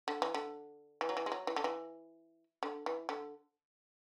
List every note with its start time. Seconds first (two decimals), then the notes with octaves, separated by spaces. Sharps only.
0.08 D3
0.22 E3
0.34 D3
1.01 E3
1.09 F#3
1.17 E3
1.26 G#3
1.32 F#3
1.47 E3
1.56 D3
1.64 E3
2.63 D3
2.86 E3
3.09 D3